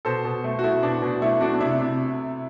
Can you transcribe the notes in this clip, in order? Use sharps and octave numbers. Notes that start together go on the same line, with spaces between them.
B2 A4 C5
B2
A3
F#4
A3 E4
B2 D4
B2
A3 E4
A3 D4 F#4
D4
C3 E4
C3